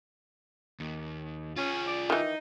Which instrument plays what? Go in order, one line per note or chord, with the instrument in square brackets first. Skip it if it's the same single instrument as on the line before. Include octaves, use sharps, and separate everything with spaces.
[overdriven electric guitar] D#2
[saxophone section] C#4 [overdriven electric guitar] F4 G#4
[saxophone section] D5
[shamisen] D#3 E3 [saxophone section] D#4